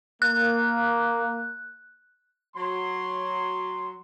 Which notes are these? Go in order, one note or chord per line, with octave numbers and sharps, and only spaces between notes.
A#3 F#6
F#3 C6